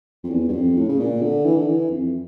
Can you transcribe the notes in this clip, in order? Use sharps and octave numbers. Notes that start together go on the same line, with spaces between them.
F2
E2
G2
F2
A2
C#3
A#2
D3
E3
D3
E3
F2